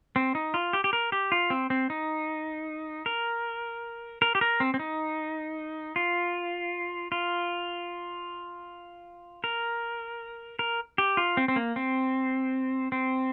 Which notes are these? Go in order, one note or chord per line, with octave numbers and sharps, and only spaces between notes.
C4
D#4
F4
G4
G4
A#4
G4
F4
C4
C4
D#4
A#4
A#4
G4
A#4
C4
C4
D#4
F4
F4
A#4
A#4
G4
F4
C4
C4
A#3
C4
C4